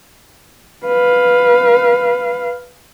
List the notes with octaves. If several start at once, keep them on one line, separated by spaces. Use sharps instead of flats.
B4 F5